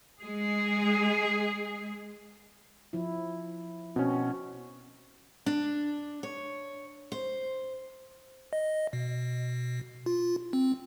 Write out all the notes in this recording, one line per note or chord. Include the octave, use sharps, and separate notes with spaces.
G#3 G#4
F3 E4
B2 C4 C#4 F#4
D4
C#5
C5
D#5
B2
F4
C4